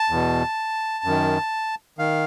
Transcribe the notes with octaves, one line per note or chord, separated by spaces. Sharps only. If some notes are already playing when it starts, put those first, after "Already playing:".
Already playing: A5
E2 B2
F#2 D#3
D#3 F5